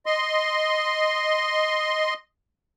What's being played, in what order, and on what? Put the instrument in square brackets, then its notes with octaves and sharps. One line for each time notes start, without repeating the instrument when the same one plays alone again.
[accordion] D#5 C6